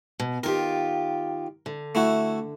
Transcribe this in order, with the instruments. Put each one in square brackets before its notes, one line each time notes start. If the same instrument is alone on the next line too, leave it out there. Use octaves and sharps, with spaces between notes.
[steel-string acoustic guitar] B2
[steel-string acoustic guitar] D#3 F4 G4 [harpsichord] A#4
[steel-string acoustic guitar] D3
[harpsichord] A3 E4 F#4